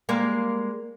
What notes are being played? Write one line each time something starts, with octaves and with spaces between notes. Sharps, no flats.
G3 G#3 A#3